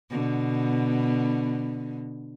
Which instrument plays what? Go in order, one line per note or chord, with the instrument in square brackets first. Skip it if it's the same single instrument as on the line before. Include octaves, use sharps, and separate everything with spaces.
[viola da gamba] B2 D3 B3